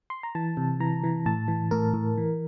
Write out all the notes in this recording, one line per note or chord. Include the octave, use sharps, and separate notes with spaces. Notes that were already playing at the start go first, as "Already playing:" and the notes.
C6
A#5
E3 A5
C3
E3 A#5
E3
A2 A5
E3
A2 A#4
A2
E3